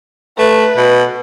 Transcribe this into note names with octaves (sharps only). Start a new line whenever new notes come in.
A3 B4
B2